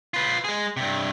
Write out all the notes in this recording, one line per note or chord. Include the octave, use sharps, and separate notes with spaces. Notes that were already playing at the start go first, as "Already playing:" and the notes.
F4 B4
G#3 G#4
G2 C3